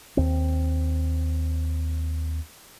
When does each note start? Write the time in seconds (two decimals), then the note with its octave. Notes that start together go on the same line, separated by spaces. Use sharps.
0.17 D#2 C4